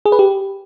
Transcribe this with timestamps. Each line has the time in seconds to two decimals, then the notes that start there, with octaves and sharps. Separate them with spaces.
0.05 G#4
0.12 B4
0.19 G4